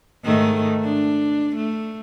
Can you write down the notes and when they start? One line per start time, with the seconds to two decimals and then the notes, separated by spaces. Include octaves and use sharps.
0.24 G#2 D#3 A3
0.84 D4
1.57 A3